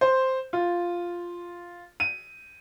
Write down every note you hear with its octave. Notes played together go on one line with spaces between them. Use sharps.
C5
F4
D#7